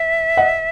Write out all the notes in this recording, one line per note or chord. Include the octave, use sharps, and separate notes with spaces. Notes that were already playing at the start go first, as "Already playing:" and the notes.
Already playing: E5
D#5 F#5